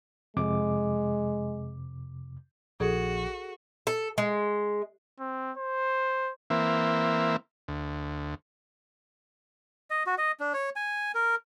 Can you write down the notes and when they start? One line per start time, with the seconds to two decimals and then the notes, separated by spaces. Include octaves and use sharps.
0.37 F2 C3 G#3 D6
2.80 A#1 F#4 G#4 A4 D5
3.87 A4
4.18 G#3
5.20 C4
5.57 C5
6.50 E3 A#3 C4 E5
7.68 D2
9.90 D#5
10.06 F#4
10.18 D#5
10.40 D4
10.54 C#5
10.76 G#5
11.15 A#4